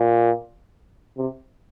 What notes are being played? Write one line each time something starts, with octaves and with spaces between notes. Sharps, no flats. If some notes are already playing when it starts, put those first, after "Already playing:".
Already playing: A#2
C3